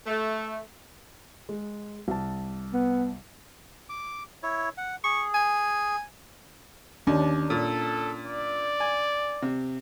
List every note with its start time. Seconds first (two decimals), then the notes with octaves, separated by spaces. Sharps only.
0.07 A3
1.49 G#3
2.08 C2 A5
2.74 B3
3.89 D6
4.43 E4 C#5
4.78 F#5
5.04 G#4 C#6
5.34 G#5
7.07 D#2 C#4 D4
7.50 A#2 A4
8.28 D5
8.80 G#5
9.42 C3